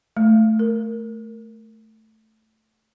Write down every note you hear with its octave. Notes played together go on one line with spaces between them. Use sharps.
A3
A#4